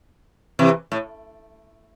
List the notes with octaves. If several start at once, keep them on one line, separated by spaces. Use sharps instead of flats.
C3 E3
A2